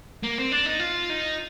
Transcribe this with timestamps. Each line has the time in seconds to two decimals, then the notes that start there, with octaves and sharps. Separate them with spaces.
0.23 A#3
0.38 C4
0.52 D4
0.66 D#4
0.79 F4
1.10 D#4